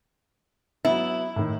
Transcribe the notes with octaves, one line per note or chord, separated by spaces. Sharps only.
F#3 B3 E4
A2 D#3